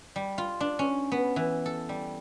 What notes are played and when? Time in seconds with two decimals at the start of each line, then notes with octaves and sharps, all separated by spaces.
0.16 G3
0.38 F4
0.60 D4
0.79 C#4
1.12 B3
1.36 E3
1.66 A4
1.89 G3